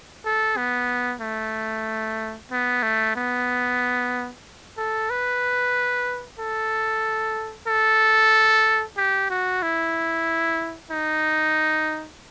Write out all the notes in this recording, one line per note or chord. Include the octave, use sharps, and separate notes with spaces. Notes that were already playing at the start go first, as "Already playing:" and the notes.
A4
B3
A3
B3
A3
B3
A4
B4
A4
A4
G4
F#4
E4
D#4